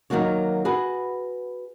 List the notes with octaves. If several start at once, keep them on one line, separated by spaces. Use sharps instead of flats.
D#3 E3 F#3 A#3 F#4 C#5
F#4 G#4 B4